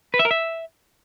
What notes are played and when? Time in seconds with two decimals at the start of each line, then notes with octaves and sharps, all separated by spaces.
0.14 B4
0.19 E5
0.25 A#4
0.31 E5